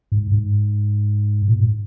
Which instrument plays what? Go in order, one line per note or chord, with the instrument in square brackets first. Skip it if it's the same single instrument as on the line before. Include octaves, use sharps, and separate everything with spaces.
[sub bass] G#2
G#2
A#2
G#2